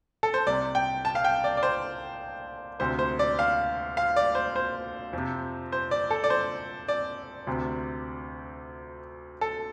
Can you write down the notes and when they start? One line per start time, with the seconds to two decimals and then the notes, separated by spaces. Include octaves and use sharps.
0.23 A4
0.34 C5
0.46 C2 C3 D5
0.75 G5
1.05 A5
1.15 F5
1.24 G5
1.44 D5
1.57 D5
1.63 C5
2.80 D2 C3 C5
2.99 C5
3.19 D5
3.39 F5
3.97 F5
4.16 D5
4.35 C5
4.56 C5
5.13 F2 C3
5.72 C5
5.91 D5
6.11 A4
6.24 D5
6.30 C5
6.88 D5
7.47 D2 C3
9.41 A4